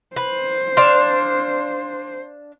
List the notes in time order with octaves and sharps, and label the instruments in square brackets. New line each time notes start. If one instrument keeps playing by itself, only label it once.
[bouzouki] B4 [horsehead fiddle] C5
[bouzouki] D4 F5 [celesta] C6